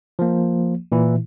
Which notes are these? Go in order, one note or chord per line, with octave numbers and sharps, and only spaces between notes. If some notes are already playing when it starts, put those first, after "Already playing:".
F3 A#3
A#2 E3 E4